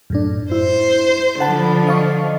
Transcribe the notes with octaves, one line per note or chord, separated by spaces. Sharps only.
F#2 A2 D4
E4 C5
D3 F3 F#5 A5 B5
D#5 F5 C#6